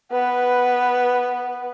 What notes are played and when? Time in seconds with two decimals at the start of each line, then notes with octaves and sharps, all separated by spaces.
0.12 B3 B4